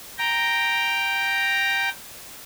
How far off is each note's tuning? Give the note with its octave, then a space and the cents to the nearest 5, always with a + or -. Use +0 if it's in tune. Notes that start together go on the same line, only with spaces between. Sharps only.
G5 +0 A#5 +0